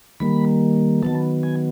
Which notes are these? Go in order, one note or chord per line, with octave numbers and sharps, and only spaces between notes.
D#3 G3 A#3 B5
D#3 F#3 B3 A5
G#5